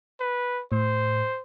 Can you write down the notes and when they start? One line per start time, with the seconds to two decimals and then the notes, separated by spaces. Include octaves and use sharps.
0.20 B4
0.72 A2 C5